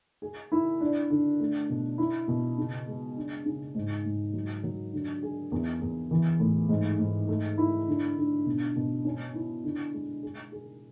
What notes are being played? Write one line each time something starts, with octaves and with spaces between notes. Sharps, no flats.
G#4
E4
D4
D3
A3
B2
E4
B2
C#3
G#3
D4
C#3
G#2
G#2
F#3
F#3
D3
G#4
E2
E2
E3
A2
G#2
G#2
A3
E4
D3
D3
B2
B2
C#4
E4
D3
G#3
G#4
G#4